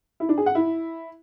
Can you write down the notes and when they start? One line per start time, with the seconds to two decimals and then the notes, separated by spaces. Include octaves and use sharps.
0.20 E4
0.29 D4
0.38 G#4
0.46 F#5
0.55 E4